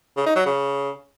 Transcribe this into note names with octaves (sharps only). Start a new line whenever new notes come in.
C#3
D#4
F#3
C#3